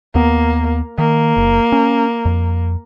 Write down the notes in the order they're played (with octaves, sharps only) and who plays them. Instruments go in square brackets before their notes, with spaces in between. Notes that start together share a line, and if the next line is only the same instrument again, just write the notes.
[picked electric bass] D#2 B3 [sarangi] A#3
[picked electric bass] D#3 [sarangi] A#3
[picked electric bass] F#1
C#4
F2